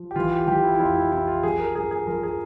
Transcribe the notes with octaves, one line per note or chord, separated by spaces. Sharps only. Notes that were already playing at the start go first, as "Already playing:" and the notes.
Already playing: F3
G4
E3 F4
G4
E3 G4
E4
E4
F2 F4
E4
C3 E4
F4
F3 G#4
A#4
G2 G#4
G#4
F3 A#4
G#4